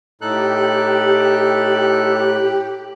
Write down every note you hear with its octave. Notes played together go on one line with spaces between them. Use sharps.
A2 D#4 G4 A4 F#6